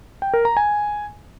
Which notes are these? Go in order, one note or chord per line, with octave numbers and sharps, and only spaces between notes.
G5
A#4
A#5
G#5